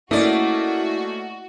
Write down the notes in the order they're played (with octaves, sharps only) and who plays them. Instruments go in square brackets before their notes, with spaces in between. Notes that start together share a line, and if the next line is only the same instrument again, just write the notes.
[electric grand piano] A3 A#3 C#4 [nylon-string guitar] E4 [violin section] F#4 [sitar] D5 D#5